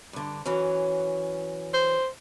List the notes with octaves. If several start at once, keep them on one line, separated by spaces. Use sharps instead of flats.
G2 D3
E3 F#3 C#4
C5